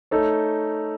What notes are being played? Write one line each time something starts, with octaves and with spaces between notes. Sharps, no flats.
A3 D#4 A4 C#5